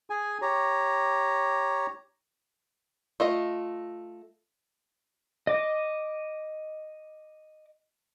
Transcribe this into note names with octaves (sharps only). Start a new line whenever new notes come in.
G#4 G#5
G4 C#5 A#5
A3 F4 D#5
D#5 D6